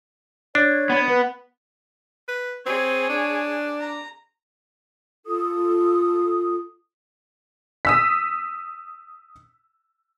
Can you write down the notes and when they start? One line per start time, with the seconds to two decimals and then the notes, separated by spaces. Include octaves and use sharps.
0.55 D4 C#5
0.90 B3
1.08 B4
2.28 B4
2.66 C4 G#4 C#5
3.09 D4
3.80 A#5
5.26 F4 A4 D#6
7.85 D#6 E6 B6